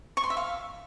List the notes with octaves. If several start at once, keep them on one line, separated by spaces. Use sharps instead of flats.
C#6
C6
E5
F5